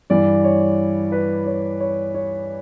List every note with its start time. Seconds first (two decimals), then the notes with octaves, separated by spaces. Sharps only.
0.10 G2 E3 D5
0.44 C#5
1.12 B4
1.46 C#5
1.80 C#5
2.14 C#5